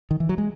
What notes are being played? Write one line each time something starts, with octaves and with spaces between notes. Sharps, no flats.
D#3
E3
F#3
G#3